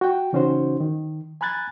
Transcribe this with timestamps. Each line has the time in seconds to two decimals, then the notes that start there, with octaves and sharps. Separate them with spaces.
0.01 F#4 G5
0.33 C#3 E3 C#4 D#4 F#4 C5
0.80 D#3
1.41 G#5 A#5 B5 F#6 G#6 A6